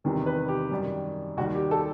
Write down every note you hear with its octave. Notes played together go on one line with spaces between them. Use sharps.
E2 C3 D#3 G3
B4
G4
F#2 D#3 G3
D#2 D#3 G3 F#4
G4
A4